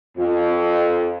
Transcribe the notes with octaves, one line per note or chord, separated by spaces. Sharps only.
F2